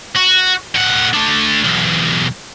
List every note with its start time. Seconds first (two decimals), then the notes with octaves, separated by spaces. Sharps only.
0.16 F#4
0.75 A2 F#5
1.14 A3 D4
1.65 B1 E2